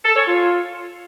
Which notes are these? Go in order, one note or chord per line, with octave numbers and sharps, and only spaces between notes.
A4
C#5
F4